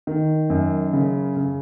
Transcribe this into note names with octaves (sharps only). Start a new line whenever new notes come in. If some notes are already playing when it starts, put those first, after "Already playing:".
D#3
F#2
C#3
C#3